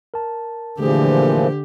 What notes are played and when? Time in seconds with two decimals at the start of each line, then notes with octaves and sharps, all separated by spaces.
0.14 A#4 A5
0.80 A#2 D3 E3 F3 A3 G4 G#4